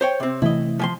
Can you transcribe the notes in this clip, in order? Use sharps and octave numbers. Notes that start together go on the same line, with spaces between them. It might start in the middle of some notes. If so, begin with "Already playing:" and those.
C5 C#5 G5
C3 C4
C3 E3 A3 E4 D#5
F3 G#5 C6